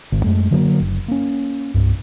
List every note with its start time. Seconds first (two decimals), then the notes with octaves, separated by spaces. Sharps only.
0.12 G#1
0.24 F#2 G#3 A3
0.51 D3 F#3 G3 A#3
0.80 F#1
1.08 A#3 C#4
1.74 C2 G2